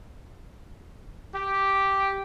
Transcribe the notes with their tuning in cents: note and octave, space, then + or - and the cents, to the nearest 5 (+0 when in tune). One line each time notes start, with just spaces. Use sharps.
G4 -5